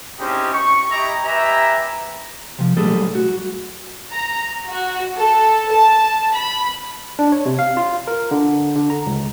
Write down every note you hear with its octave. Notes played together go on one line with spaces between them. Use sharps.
G#3 C4 C#4 D#4 E4 G4
C#6
E4 G4 D#5 E5 A#5
G4 B4 E5 G#5 A#5
C3 F3
A#2 F#3 G3 A3 G#4 A4
F#4
A#5
F#4
A4
A5
B5
D4
C#5
C3
F5
F4
A#4
D3
D3
A#5
C#2